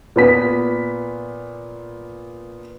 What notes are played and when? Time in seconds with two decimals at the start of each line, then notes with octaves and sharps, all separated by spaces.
0.16 A#2 B3 B6